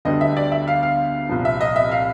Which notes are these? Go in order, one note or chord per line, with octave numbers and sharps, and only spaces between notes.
D2 D3 G3 B3 D4 D#5
E5
D5
E5
F5
F5
C2 A#2 F3
E5
D#5
E5
F5